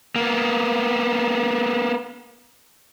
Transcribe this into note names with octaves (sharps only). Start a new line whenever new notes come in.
A#3 B3